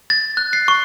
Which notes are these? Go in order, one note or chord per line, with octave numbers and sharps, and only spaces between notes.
A6
F#6
C7
C#6